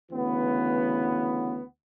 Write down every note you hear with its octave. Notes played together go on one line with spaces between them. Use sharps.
D2 C#3 E3 B3